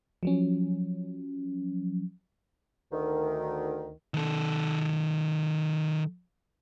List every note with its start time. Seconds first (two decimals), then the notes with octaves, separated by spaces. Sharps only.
0.23 F3 F#3 C#4
2.92 D2 D#3
4.14 D#3 A4